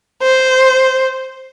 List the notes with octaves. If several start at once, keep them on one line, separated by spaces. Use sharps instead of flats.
C5